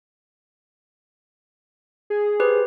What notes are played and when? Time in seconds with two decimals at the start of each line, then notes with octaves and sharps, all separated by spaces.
2.10 G#4
2.40 G4 B4 C5